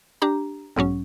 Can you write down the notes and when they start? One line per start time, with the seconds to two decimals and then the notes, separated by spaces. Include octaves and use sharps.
0.22 D4 G4 A#5
0.76 B1 G#2 F#3 C#4